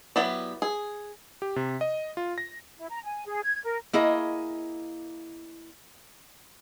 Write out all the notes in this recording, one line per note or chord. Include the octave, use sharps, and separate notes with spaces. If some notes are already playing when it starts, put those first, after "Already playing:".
F#3 B3 E4 G4 D5
G#4
G4
C3
D#5
F4
A#6
E4
A#5
G#5
G#4
G#6
A#4
A#3 E4 G#4 D#5